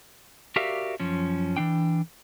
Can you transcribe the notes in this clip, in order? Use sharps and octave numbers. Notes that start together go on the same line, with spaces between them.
F#4 G4 A#4 D5 E5 F5
F#2 F3 C#4
E3 A#3 D4 G5